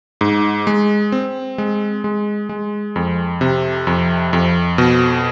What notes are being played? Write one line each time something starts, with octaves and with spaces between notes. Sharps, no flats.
G#2
G#3
C4
G#3
G#3
G#3
F2
C3
F2
F2
B2